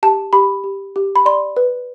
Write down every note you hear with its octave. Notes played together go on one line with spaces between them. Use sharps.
G4 A5
G4 B5
G4
G4
B5
D5 C6
B4